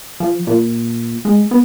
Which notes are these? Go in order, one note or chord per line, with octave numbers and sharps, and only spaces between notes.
F3
A#2
G#3
B3